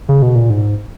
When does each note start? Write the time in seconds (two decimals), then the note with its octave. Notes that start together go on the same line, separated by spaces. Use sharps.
0.09 C#3
0.22 B2
0.36 A#2
0.50 G#2